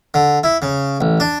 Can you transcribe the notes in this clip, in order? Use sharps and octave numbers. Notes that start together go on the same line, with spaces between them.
D3
E4
C#3
A1
D4